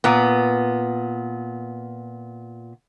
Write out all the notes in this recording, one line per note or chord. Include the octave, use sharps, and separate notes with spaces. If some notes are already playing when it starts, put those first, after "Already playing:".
A#2 B3